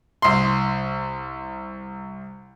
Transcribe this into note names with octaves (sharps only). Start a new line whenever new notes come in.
C2 C6